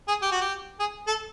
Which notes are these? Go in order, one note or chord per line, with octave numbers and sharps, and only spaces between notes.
G#4
G4
F#4
G4
G#4
A4